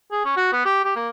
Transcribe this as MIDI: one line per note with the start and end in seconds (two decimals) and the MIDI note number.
0.12 0.21 68
0.25 0.32 61
0.36 0.49 66
0.53 0.61 59
0.65 0.84 67
0.84 0.93 67
0.96 1.09 58